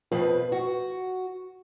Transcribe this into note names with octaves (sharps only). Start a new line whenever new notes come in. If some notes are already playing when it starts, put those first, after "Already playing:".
F2 B2 F3 B4
F#4